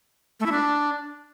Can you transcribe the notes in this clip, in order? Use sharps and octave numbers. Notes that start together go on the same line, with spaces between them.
A3
E4
D4